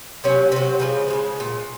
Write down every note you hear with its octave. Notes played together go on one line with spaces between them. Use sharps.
C3 F#3 C#4
C3 F#3 C4
C#3 F3 G#3
F3 G#3
C#3
A#2 G#3